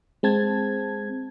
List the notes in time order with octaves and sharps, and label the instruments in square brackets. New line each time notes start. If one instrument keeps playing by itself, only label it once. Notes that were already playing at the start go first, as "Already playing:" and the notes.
[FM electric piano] G#3 C4 A5 G#6